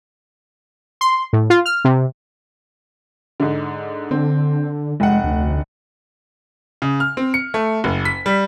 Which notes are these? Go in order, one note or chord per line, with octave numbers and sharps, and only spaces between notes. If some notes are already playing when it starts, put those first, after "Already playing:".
C6
A2
F4
F6
C3
G#2 D3
D3 C4
F1 G#3 F#5
D2
C#3
F6
C4
C#7
A3
F#1
B6
G3